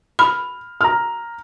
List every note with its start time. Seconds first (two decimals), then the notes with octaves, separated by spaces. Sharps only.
0.19 B5 F6
0.81 A#5 F6